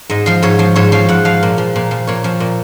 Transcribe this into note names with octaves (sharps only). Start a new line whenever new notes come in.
G#2 D#5
F3 F5
G#2 C#5
F3
G#2 C#5
F3 F5
G#2 F#5
F3 F5
A#2
F3
A#2
F3
A#2 C#5
F3
A#2